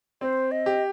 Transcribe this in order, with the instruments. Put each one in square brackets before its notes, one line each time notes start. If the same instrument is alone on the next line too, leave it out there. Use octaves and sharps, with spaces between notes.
[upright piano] C4 [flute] C5
[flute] D#5
[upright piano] G4